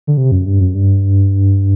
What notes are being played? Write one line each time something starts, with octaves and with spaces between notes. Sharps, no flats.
D3
C3
F#2
G2
F#2
G2